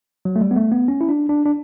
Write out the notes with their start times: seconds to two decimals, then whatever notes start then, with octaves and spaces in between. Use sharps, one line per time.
0.25 F#3
0.36 A3
0.41 G3
0.51 B3
0.56 A3
0.72 B3
0.88 C#4
1.01 E4
1.09 D4
1.29 D4
1.46 D4